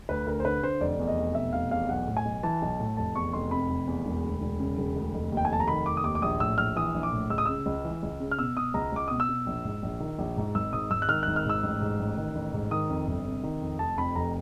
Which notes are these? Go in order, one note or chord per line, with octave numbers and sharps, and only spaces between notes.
D2 B4
D2 A#4
C5
D3 B4
D3 C5
F1 D5
E2
D#5
F1
B2 E5
F1 F5
E2 F5
B1 F#5
A2
G#5
B1
E3 A5
B1
A2
F1 A5
E2 C#6
F1 C6
C3 B5
F1
E2
E1
D2
E1
C#3
E1
D2
F1
D#2
G5
G#5
F1 A5
A#5
D#3 B5
F1 D6
D#6
D#2 D6
D6
A#1 D#6
A2 E6
A#1 F6
E3 D#6
A#1
D6
A2
C#2 E6
D#6
C#3 E6
C#2
E3
C#2
C#3
F6
B2 E6
B2 D#6
C#2 A#5
C#2 D6
B2 D#6
E6
B2
A#1
G#2
A#1
D#3
A#1
G#2
G#1 E6
G#2 D#6
G#1 E6
F#6
D#3 F6
G#1 F#6
F6
G#2 E6
A1
G#2
A1
D#3
A1
G#2
D#3 D#6
F2
G1
C3
D#3
F2
F1 A5
F2 B5
F1 A#5